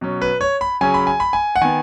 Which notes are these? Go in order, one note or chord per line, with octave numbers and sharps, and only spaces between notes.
B2 F#3 C#4
B4
C#5
B5
C#3 F#3 C#4 G#5
B5
G#5
B5
G#5
F#5
D#3 B3 G#5